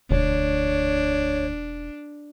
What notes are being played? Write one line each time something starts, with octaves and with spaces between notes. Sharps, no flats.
E1 D2 D4 C#5